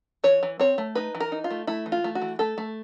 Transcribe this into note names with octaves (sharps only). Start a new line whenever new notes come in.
E3 C#5
E3
C4 C#5
A3
D#4 B4
E3
A#4
D#4
F4
A3
A3 E4
E3
F4
A3
F#4
E3
A3 A4
A3